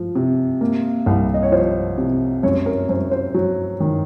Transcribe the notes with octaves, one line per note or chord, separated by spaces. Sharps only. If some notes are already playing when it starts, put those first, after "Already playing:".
Already playing: F3
C3
A#3
C2
D#5
C#5
F3 C5
C3
F#2 C#5
A#4
F#2 C5
C5
F#3
D#3